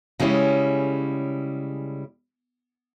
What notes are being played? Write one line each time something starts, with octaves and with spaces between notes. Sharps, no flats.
C#3 G3 G#3 C#4 E4